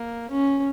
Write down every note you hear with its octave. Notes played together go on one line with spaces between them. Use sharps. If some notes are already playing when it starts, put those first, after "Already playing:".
Already playing: A#3
C#4